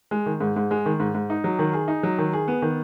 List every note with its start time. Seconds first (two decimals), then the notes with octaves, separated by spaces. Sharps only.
0.11 G#3
0.26 D#3
0.41 G#2
0.56 G#2
0.71 G#3
0.86 D#3
1.00 G#2
1.15 G#2
1.30 D#4
1.44 F#3
1.59 D#3
1.73 G#4
1.88 D#4
2.03 F#3
2.19 D#3
2.33 G#4
2.48 B3
2.62 D#3